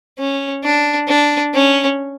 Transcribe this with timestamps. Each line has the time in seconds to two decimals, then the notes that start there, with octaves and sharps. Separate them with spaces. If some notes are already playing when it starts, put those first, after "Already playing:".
0.19 C#4
0.64 D4
1.08 D4
1.54 C#4